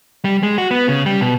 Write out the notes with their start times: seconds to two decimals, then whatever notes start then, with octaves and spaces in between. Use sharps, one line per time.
0.25 G3
0.43 G#3
0.58 F#4
0.71 B3
0.89 C#3
1.06 G3
1.21 B2